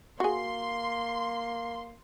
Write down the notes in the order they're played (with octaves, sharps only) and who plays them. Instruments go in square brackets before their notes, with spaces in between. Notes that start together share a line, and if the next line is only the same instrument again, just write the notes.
[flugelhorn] A#3 [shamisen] F#4 G#4 [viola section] C6